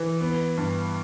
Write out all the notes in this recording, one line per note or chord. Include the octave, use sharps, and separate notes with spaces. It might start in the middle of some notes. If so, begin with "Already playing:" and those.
Already playing: E3
B3
G2